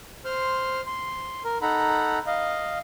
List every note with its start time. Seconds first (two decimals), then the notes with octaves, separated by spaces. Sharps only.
0.25 C5 C6 F6
0.87 C6
1.45 A#4
1.62 D#4 A4 F#5 A#5 B5
2.27 D#5 F5